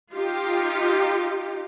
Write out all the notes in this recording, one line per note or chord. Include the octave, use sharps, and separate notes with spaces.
D#4 F4 G4